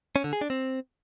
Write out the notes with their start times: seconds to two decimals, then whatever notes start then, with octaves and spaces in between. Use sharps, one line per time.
0.16 C#4
0.24 D3
0.33 G#4
0.41 D4
0.50 C4